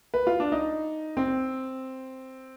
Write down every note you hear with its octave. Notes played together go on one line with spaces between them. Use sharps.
B4
F4
D4
D#4
C4